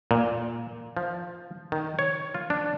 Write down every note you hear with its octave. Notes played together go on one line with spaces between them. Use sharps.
A#2
F3
D#3
C#5
F4
D4